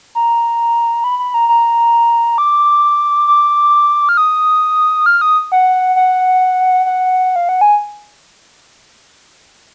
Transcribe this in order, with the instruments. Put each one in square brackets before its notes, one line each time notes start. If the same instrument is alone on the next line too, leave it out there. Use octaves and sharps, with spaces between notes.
[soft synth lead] A#5
B5
B5
A#5
A#5
D6
D6
F6
D#6
F6
D#6
F#5
F#5
F#5
F5
F#5
G#5